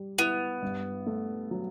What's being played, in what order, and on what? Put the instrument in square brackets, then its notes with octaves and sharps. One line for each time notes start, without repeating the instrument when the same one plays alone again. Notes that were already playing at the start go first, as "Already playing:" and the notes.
Already playing: [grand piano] G3
[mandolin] B3 [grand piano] E4
[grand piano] G2
A3
F#3